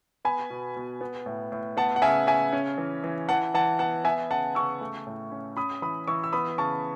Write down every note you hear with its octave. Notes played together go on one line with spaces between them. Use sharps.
B3 G#5 B5
B2
B2
B3
A2
A2
B3 F#5 A5
F#5
C#3 E5 G#5
C#3 E5 G#5
C#4
E3
E3
E3 F#5 A5
E3 F#5 A5
B3 F#5 A5
B3 E5 G#5
C#3 F#5 A5
C#3 C#6 E6
A3
A2
C#4
C#4 B5 D#6
E3 B5 D#6
E3 C#6 E6
E6
B3 B5 D#6
C#3 A5 C#6